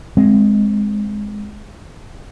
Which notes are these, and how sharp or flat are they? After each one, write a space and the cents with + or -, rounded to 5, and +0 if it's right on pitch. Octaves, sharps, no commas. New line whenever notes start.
G#3 +0 C4 +0